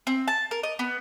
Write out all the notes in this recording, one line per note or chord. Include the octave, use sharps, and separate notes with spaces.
C4
A5
A#4
D#5
B3